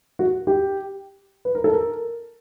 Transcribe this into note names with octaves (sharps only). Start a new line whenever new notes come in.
F#4
G4
B4
A#4
A4
A#4